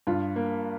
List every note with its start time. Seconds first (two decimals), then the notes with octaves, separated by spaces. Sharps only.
0.07 G2 F4
0.36 A#3